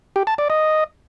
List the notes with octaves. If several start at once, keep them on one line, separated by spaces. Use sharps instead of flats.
G4
A5
D5
D#5